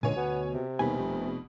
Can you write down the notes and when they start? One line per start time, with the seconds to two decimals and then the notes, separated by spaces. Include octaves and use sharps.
0.03 C#2 A#2 D3 G#3 C#5 G#5
0.16 D2 B2 B3
0.53 C3
0.79 D#2 B2 G3 B4 G#5
0.98 F1